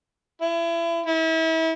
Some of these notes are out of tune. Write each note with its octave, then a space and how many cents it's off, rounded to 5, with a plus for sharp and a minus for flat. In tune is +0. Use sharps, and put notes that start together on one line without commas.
E4 +35
E4 -35